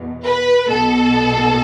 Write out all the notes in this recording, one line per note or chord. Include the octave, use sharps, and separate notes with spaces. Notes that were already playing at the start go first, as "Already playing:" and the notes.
Already playing: E2 B2
B4
B1 B2 A4